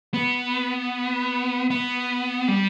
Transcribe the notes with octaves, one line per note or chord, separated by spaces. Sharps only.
B3
B3
G3